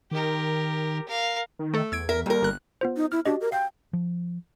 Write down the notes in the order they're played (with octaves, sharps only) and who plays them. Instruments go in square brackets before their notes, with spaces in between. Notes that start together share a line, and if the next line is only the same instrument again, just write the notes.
[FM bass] D#3 [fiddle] G4 A#4
[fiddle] A#4 F5
[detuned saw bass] D#3
[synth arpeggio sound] A3 A4
[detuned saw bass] E2 [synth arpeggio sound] E6 G#6 D7
[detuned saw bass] E2 [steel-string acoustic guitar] A#4 [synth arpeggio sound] E5
[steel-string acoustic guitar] D#2 A#4 [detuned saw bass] G3
[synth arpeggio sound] G1 F#6
[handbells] B3 F4 C5
[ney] D#4
[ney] E4 [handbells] F6
[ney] D4 [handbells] F#4 G4 D#5
[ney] A#4
[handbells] F5 [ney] G5
[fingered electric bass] F3